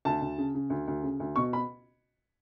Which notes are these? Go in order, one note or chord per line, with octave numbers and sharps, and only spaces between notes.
D2 A5
D2
C#3
C#3
D2
D2
C#3
D2
B2 C#6
B5